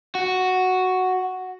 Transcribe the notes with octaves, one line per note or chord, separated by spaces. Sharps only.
F#4